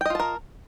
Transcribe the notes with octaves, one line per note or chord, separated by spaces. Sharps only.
F4 A#4 D#5 G5 A5